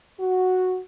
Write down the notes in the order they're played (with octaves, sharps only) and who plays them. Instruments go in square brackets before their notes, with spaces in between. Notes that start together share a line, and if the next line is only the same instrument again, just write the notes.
[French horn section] F#4